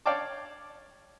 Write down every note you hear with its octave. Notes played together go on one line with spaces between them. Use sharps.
C#5 D5 F5 G5 A5 D6